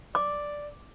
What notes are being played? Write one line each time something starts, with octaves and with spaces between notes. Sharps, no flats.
D5 D6